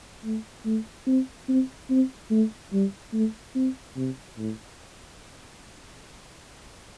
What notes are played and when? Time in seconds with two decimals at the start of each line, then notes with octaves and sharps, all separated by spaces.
0.24 A3
0.65 A3
1.07 C4
1.49 C4
1.90 C4
2.31 A3
2.72 G3
3.13 A3
3.55 C4
3.96 C3
4.38 A2